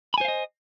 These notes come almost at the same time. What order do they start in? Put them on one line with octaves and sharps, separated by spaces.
B5 G#5 C5 F5 D#5